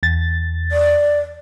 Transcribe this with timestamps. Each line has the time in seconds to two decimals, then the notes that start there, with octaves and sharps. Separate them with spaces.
0.03 E2 A6
0.72 D5